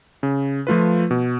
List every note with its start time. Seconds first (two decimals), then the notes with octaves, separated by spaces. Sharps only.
0.23 C#3
0.67 F3 A3 F4 B4
1.11 B2